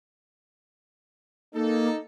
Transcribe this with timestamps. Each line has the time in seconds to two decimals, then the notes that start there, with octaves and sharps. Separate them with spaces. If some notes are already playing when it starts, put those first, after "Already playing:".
1.54 A#3 D#4 A4